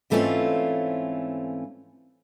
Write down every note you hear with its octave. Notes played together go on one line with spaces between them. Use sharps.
G#2 E3 A3 C4 C#4 F4